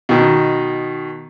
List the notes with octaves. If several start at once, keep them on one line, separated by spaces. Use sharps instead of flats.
B2 D#3